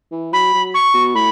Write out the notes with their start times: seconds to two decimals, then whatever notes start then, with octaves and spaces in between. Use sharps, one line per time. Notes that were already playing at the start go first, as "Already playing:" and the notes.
0.12 E3
0.33 F#3 B5
0.54 F#3
0.74 C#6
0.94 B2
1.15 A2 B5